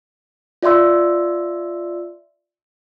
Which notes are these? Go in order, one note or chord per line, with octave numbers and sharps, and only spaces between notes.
F4 D5 E5 C6 E6